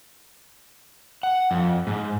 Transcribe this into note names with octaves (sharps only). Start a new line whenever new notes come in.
F#5
F2
G#2